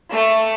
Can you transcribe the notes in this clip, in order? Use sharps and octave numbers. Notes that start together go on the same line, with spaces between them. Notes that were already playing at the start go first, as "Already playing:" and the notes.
A3